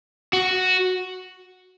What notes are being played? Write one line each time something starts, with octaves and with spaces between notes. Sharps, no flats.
F#4